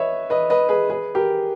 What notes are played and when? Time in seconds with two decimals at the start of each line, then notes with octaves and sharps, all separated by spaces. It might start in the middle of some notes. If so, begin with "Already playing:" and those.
Already playing: B4 C#5 D#5 E5
0.30 B4 D#5
0.50 B4 D#5
0.69 G#4 B4
0.90 G#4 B4
1.15 G4 A#4